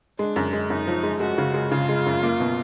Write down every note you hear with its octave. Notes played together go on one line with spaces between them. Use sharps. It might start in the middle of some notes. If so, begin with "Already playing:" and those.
G#3 D4
F#2
G#3
F#2 D#4
F3
G#3
G#3 F#4
C#3
G#3
C#3 F4
G#3
F#2
A#3
B2